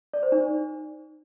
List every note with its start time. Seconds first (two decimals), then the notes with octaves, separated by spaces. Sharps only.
0.13 D5
0.23 C5
0.32 D#4